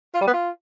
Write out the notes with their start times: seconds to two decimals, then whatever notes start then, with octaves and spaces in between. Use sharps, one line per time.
0.15 F4
0.21 G3
0.27 B3
0.34 F4